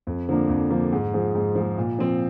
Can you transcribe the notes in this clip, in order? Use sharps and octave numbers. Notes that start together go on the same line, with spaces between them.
F2
D3 F3 A#3 D4
F2
D3 F3 A#3 D4
G#2
F3 G#3
G#2
F3 G#3
A#2
F3 C4